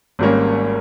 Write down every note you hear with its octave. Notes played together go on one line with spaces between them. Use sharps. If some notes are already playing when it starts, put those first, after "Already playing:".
G#1 G#2 G3 A#3 C#4